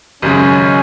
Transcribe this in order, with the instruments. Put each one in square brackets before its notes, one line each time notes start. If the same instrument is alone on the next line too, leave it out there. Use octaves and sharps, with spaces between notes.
[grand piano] G#1 F#2 C#3 G#3 [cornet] C#4